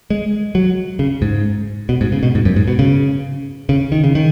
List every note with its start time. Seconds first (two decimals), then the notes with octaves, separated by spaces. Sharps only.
0.10 G#3
0.55 F#3
0.99 C#3
1.22 G#2
1.89 B2
2.01 G#2
2.12 C#3
2.23 B2
2.35 G#2
2.45 F#2
2.56 G#2
2.68 B2
2.79 C#3
3.69 C#3
3.92 D#3
4.04 C#3
4.15 D#3